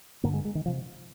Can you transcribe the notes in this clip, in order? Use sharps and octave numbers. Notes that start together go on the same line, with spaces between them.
G2 D3 A#3
G#3
G#3
D#3
C3 F3